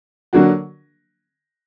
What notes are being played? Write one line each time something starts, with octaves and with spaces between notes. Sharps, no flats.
D3 F#3 A#3 D4 F#4